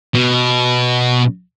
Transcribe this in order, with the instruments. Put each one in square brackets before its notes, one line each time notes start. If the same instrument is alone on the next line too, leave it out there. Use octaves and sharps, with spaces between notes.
[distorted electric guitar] B2